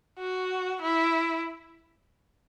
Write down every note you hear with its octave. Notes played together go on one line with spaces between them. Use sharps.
F#4
E4